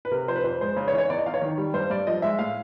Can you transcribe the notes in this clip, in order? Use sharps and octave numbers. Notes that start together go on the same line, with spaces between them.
B4
C3 A#4
F3 C5
B4
F2 C5
G#3 C5
C#3
C#5
E3
C#5
E2 D5
D#5
E2 F5
C#5
D#3
G3
G2 C5
G2 D5
F3 D#5
G#3 E5
A2 F5